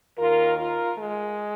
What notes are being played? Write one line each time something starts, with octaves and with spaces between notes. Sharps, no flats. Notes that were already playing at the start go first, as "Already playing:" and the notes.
D#2 D#3 F4 A#4
F4 A#4
G#3